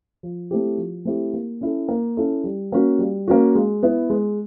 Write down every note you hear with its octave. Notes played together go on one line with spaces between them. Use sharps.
F3
A3 C4 E4 G4
F3
A3 C4 E4 G4
A#3
C#4 E4 A4
A#3
C#4 E4 A4
G3
A#3 C#4 F#4
G3
A#3 C#4 F#4
G#3
B3 E4
G#3